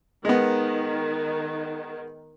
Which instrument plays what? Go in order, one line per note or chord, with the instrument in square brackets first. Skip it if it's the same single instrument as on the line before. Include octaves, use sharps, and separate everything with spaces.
[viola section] D#3 [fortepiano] G#3 B3